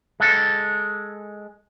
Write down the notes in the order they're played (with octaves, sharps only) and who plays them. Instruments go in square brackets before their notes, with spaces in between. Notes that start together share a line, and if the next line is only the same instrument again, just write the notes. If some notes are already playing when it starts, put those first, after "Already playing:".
[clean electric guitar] G#3 A4